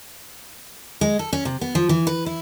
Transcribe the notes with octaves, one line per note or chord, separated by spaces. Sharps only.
G#3
A4
C#4
C3
B3
F3
E3
B4
E4